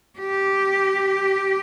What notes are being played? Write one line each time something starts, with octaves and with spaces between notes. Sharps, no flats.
G4